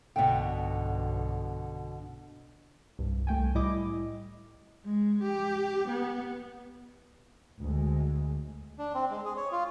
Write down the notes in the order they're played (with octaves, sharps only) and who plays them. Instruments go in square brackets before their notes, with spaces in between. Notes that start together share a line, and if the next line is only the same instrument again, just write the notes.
[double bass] B1 G2 [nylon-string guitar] B2 D3 [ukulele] E5 G5
[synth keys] C2 G2
C2 A3 G5 G#5
A2 G3 E4 D#5 D6
[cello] G#3
G4
B3
[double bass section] D2 G#3
[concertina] D4
C4
G#3
G#4
C#5
F4